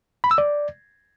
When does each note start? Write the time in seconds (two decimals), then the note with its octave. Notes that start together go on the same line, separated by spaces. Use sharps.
0.24 B5
0.31 E6
0.38 D5